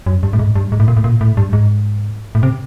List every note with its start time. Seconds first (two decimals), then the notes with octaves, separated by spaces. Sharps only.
0.06 F#2
0.23 G2
0.33 A2
0.39 G#2
0.55 G2
0.72 G#2
0.80 A2
0.88 A#2
0.97 A2
1.04 A#2
1.21 A2
1.37 G2
1.53 G#2
2.35 A2
2.43 C3